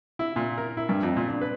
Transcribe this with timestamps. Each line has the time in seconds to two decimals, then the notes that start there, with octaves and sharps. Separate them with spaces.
0.19 E4
0.36 A#2
0.58 A#4
0.77 E4
0.89 G2
1.03 F2
1.16 A#2
1.28 D4
1.41 B4